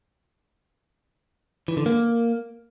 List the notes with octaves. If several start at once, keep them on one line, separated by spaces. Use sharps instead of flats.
E3
D3
A#3